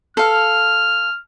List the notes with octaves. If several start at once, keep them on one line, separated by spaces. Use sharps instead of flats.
A4 F5 F6